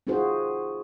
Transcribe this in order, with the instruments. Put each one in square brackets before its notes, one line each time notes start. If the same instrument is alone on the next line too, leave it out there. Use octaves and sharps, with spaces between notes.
[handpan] C4 D#4 F4 F#4 G#4 C5